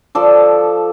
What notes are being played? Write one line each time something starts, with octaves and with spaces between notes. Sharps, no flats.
F3 A4 D5